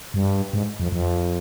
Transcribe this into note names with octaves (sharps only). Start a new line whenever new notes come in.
G2
G#2
F2
F2